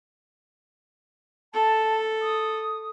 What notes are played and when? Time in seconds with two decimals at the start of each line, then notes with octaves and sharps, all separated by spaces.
1.54 A4 A5
2.22 D#6